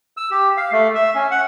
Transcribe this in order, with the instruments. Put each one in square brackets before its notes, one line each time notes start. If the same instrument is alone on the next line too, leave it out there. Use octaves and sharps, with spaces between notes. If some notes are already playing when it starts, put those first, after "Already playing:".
[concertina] E6
G4
F5
A3
E5
C#4
F#5